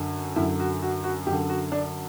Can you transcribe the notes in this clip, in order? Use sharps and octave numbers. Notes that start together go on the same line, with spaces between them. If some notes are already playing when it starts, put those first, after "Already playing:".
Already playing: F#2 D3
F#2 D3 E4
F#4
F#4
F#4
F#2 D3 G4
F#4
D4